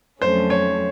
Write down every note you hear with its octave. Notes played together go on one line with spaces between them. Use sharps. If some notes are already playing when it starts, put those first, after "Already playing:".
F2 D3 F#3 A3 C#4 C5
C#5